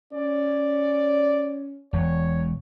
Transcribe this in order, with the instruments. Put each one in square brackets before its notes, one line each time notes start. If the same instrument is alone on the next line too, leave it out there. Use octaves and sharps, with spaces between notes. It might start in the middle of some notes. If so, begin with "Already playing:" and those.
[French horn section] C#4 [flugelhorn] D5
[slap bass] E1 [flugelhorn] C#5